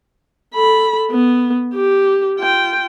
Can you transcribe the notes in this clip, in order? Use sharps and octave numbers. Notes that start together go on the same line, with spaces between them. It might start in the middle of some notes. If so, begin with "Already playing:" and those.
A4 B5
B3
G4
F4 G5